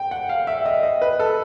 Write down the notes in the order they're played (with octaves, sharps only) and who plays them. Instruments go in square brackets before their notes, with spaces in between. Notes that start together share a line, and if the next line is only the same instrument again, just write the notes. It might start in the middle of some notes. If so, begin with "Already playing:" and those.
Already playing: [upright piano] G5
F#5
F5
E5
D#5
D#5
B4
A4